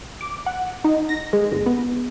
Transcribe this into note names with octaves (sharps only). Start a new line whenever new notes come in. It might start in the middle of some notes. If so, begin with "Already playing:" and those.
D6
F#5
D#4
A#6
G#3
G1
B3